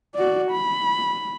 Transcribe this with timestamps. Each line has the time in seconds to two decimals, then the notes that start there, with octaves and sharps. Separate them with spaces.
0.15 F#4 D5
0.52 B5